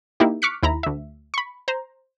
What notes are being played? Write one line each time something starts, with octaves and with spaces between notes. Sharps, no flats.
A#3 D#4 E4 G4
C#6 D6 F6 F#6 B6 C#7
D#2 E4 A#5 B5
D2 E5
B5 C#6
C5 A#5